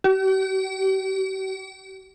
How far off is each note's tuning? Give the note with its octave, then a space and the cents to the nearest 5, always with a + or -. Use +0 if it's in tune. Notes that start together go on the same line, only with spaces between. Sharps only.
G4 -45